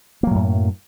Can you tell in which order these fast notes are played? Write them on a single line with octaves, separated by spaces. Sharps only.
A#3 F#3 A2 F#2